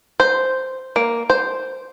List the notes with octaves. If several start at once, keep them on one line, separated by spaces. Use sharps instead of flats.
C5
A#3
C5